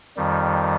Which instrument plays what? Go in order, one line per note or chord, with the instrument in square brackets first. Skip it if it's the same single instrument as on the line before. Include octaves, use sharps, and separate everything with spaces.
[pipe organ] F2 D#3 G3